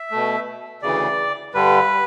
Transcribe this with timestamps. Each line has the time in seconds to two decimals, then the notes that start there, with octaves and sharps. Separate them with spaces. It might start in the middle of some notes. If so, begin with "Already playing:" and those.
Already playing: E5
0.11 B2 A3
0.82 D2 C#3 E3 D5
1.54 G2 D3 G3 B4